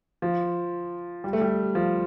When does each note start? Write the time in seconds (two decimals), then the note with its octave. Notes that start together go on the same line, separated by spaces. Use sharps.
0.22 F3
1.24 G3
1.33 A3
1.41 G3
1.75 F3